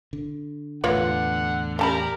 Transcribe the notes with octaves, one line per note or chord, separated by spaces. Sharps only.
D3
E2 A2 D3 F4 B4 C#5 F#5
C#4 G4 A#4 D5 A5 B5